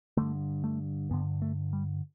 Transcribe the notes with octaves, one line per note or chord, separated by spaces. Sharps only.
G2 D3 A3
A3
G2 D3 B3
A3
G3